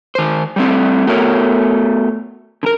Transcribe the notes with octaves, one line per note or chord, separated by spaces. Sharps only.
D#3 C5
G3 A3 C4
A3 B3 F#4 A#4 C#5
D3 A#4